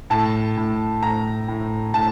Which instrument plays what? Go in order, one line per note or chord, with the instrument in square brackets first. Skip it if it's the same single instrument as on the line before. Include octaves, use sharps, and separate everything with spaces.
[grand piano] A2 A5
A2
A2 A#5
A2
A2 A5